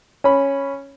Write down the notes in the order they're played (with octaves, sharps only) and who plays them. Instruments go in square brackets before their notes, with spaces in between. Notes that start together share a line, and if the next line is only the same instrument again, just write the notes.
[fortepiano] C#4 B5